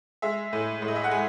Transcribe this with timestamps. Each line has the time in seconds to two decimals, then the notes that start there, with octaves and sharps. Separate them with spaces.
0.22 G#3 E5
0.53 A2
0.82 A2
0.88 D#5
0.96 E5
1.04 F#5
1.11 G#3 G#5